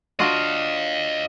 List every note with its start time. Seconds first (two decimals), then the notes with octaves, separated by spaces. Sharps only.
0.20 D4 F4 F#4 D#5 F5